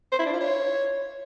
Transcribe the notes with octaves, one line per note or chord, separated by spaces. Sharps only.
C5
E4
D4
F4
C#5